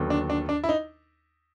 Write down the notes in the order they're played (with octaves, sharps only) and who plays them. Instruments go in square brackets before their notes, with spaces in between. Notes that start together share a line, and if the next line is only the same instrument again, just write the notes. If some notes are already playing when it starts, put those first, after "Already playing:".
Already playing: [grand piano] D#2 D3 F#3 B3
D4
D4
D4
E4
D#4